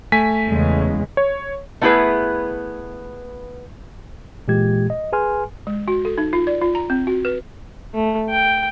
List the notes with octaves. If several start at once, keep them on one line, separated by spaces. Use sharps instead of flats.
A3 G#5 B6
E2 C#3 G#3
C#5
A3 B3 E4 F4 G#4 B4
A#2 E3 G#3 G4 G#6
D#5
G#4 B4 G#5 C6 F6
G#3
F#4
A4
D#4
F4
D5
F4
A#5
C4
F#4
B4
A3
G5